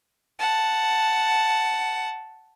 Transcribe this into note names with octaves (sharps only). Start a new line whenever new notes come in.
F#5 A5